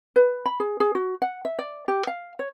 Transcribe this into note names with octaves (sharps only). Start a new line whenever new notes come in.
B4
B5
G#4
G#4
F#4
F#5
E5
D5
G4
F5
C#5